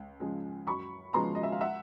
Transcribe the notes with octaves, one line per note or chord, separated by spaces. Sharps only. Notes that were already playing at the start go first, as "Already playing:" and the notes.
Already playing: C#2
C#3 F3 G#3
F#2 B5 C#6
C#3 F3 G#3 B3 A#5 C6
D#5
E5
F5
E5 F#5